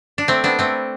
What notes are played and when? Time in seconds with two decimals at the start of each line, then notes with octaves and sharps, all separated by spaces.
0.18 D4
0.28 A3 C4
0.44 B3 D4
0.59 A3 C4